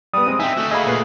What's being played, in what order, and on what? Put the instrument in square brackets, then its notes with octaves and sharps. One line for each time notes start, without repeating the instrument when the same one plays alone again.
[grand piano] G3 B3 [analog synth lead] D#6
[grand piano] G#3 C4
[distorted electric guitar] C4 D#4 [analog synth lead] E5 [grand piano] G5 G#5
[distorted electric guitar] A3 F#4
[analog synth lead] G#4 [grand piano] D#5 F5 B5
[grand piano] A#2 B4 C7